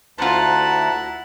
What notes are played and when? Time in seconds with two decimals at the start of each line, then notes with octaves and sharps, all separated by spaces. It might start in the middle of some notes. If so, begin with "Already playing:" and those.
0.18 D2 E4 F4 C5 F#5 A5 A#5